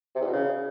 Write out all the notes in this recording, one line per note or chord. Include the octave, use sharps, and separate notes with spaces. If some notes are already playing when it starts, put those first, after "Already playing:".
C3
E2
B2
C#3